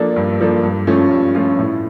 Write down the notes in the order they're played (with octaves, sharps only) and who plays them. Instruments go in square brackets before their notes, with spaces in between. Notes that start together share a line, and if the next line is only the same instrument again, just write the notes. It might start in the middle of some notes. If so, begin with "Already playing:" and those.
Already playing: [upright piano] F3 A#3 D4 A4
G2
F3 A#3 D4 A4
G2
F3 A3 C#4 F4
G2
F3 A3 C#4 F4
A2